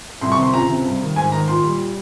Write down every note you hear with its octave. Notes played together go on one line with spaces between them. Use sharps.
C2 C6
C#6
C3 C6
C#2 A#5
C3
G2
D#3
G#2 G#5
D#3 A#5
A#2 C6
G3